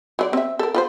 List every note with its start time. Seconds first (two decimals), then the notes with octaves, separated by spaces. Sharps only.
0.19 F#3 F4 D5
0.33 C4 E5
0.59 A4 A#4
0.74 F4 B4 C5